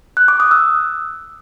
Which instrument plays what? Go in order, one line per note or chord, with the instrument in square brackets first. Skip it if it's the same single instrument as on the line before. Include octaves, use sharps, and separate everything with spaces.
[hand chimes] F#6
D6
D#6
E6